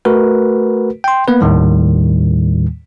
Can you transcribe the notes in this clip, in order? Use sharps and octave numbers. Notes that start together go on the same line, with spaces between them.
A3 F#4 A#4 B4
G5 C6
A#3 B3 B4
D#2 A2 D#3 G3